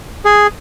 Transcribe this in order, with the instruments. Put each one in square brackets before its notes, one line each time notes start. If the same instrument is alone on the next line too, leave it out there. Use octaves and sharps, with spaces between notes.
[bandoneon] G#4